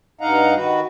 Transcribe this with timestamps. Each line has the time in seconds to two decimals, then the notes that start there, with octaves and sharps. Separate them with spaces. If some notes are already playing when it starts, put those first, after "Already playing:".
0.21 G2 D#4 D#5 F5 F#5 A#5
0.55 D#3 F#4 B4